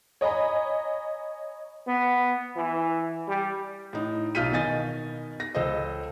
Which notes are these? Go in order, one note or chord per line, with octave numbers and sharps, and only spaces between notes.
C#5 D#5 G#5 A#5 B5
B3
E3
G3
A2 D#4
B1 F4 F6 G6 B6 D#7
B2 D#3 D#5 G#5 A6
A#6
C#2 A4 C5 D#5